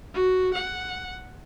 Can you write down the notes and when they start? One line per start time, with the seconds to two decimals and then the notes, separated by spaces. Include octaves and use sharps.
0.14 F#4
0.53 F#5